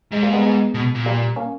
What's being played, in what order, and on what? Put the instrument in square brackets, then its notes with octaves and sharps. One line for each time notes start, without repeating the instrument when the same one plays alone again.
[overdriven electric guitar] G#2 [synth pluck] G#3
[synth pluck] G3 A#3
G#3 B3
G#3 B3
[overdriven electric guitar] B2
A#2
[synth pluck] G3 A#3
A#3 C#4